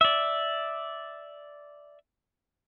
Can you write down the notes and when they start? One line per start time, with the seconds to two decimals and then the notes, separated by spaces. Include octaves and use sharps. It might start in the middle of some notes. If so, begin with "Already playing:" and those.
0.01 D5 E5